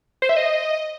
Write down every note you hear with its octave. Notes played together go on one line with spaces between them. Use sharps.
C5
E5
D#5